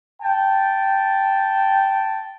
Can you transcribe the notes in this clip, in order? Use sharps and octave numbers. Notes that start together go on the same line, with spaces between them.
G5 A5